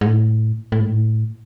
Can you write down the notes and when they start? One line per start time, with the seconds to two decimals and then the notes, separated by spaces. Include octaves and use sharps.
0.01 G#2
0.06 A2
0.72 A2
0.80 G#2
0.89 A2